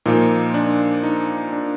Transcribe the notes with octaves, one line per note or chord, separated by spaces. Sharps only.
A#2 F3 A#3 D#4
D4
D#4
D4